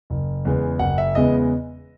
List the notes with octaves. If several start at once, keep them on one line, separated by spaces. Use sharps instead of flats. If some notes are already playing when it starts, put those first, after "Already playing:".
F#1
E2 C#3 G#3 B3
F#1 F#5
E5
E2 C#3 G#3 B3 D#5